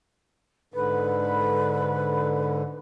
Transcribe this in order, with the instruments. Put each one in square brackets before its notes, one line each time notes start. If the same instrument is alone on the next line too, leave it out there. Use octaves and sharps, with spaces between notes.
[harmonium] G#2 D3 [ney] B4